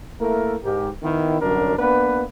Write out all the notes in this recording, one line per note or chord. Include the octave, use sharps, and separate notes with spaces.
A3 A#3 E4 A4 A#4
G#2 G4 A#4
D#3 B3 E4
C2 F#2 D3 F#3 D4 A#4
A#3 B3 D4 B4